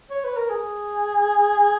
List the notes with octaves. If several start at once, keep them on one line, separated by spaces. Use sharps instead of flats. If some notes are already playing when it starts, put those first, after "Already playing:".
C#5
B4
A#4
G#4